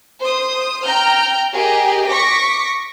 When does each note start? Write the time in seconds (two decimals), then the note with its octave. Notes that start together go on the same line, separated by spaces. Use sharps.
0.22 C5 D#6
0.85 G5 A#5 F6 G6
1.53 G4 G#4 A#4 D#5
2.08 C#6 D6 A#6 B6